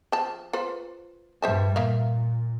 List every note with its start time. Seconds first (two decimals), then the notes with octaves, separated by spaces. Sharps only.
0.12 F3 A5
0.53 F4 B4 C5
1.42 G2 G3 C5 E5 A5
1.76 A#2 A#3 E5 F5